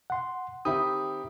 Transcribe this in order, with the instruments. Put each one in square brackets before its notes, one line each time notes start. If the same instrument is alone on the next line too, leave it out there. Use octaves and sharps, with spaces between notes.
[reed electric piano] F#5 C6
[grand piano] D#3 C4 G4 [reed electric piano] E5 B5 D#6